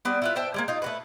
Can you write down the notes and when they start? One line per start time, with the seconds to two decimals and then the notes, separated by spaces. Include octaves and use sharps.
0.05 G3 B3 C4
0.22 E4 F4 B4
0.36 C5 E5 G5 A5
0.54 G3 G#3 A#3
0.68 D#4 F4
0.82 A3 F#4 B4